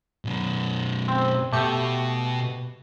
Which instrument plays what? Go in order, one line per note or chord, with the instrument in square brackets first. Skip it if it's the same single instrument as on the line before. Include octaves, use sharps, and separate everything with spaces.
[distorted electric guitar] F#2 B2
[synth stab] C4
[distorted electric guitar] B2 [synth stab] A3 G4 C#7